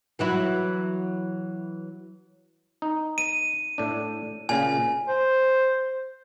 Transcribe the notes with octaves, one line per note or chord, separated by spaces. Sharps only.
E3 F#3 E4
D#4
D#7
A2 D4
A#2 C#3 G#5
C5